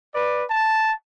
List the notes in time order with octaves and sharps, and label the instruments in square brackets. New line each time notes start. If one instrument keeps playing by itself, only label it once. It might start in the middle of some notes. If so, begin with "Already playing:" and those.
[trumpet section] B4 D5
A5